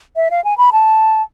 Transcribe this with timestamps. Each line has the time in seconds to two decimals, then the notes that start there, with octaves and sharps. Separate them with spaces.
0.16 E5
0.31 F5
0.44 G#5
0.58 B5
0.72 A5